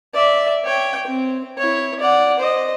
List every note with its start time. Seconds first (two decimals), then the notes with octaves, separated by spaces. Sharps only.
0.13 D5 E5
0.64 C#5 G5
1.07 C4
1.58 E4 C#5
2.00 D5 F#5
2.39 C5 D#5